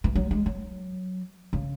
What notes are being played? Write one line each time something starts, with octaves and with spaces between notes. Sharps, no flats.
E3
F#3
G#3
F#3
C#3